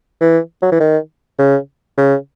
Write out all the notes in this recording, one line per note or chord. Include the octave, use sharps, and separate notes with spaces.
E3
F#3
E3
D#3
C#3
C#3